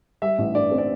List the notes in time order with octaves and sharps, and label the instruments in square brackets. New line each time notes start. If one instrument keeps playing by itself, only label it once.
[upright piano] G3 E5
A1
G2 D5
C4
D5